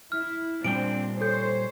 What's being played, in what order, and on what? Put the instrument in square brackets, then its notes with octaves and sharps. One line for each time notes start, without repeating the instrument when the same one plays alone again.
[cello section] E4 [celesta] F6
[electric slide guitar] A#2 G3 G5 [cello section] C4 D4 [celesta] D7
[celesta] A4 G6 [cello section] C5 C#5